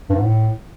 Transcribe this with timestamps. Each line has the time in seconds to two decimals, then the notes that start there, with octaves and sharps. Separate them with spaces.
0.10 G2
0.16 G#2
0.23 A2